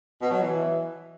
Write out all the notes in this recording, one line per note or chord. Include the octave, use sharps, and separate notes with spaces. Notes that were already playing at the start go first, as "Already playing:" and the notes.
B2
F#3
E3